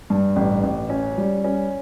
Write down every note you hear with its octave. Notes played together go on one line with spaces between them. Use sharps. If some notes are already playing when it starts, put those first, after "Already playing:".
G2
A1
A1
C#4
G3
C#4